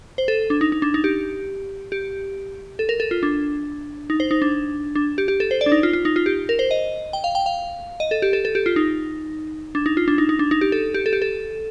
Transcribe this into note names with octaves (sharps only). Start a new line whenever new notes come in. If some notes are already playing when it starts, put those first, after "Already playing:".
C5
A4
D4
D#4
D#4
D4
D#4
G4
G4
A4
A#4
A4
F4
D4
D#4
C5
D#4
D4
D4
G4
G4
A4
C5
D5
D4
D#4
F4
F4
D#4
F4
G4
A#4
C5
D#5
G5
F5
G5
F5
D#5
A4
G4
A4
A4
G4
F4
D#4
D4
D#4
F4
D4
D#4
D#4
D4
D#4
G4
A4
G4
A4
G4
A4